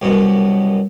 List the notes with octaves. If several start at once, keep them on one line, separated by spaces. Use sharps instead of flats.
C2 F#2 B2